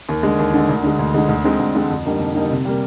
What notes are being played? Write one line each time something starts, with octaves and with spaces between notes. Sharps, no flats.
D#2
D3 G#3
D#2
D3 G#3
D2
D3 G#3
D2
D3 G#3
D2
D3 G#3 C4
D2
D3 G#3 C4
F2
D3 G3 A#3 D#4
F2
D3 G3 A#3 D#4
C3
G3 A#3